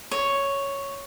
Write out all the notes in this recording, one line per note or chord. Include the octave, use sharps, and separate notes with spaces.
C#5